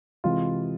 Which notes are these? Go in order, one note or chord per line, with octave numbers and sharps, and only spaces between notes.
C3 E3 G#3 F4